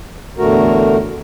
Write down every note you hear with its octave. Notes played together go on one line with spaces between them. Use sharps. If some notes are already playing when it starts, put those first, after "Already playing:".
E2 A2 D3 A3 F#4 A#4